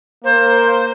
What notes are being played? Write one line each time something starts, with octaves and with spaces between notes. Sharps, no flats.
A#3 C5